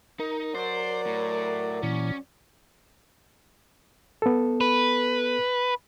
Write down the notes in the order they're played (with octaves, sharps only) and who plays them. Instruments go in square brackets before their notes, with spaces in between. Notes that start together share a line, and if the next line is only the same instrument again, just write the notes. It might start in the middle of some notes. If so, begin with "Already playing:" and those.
[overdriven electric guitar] D#4 [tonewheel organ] A#4
[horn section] F#3 D5 [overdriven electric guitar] C5
[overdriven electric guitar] A2
[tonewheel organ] A#2 E3 [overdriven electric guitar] C#4
[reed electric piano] B3 A4
[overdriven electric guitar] B4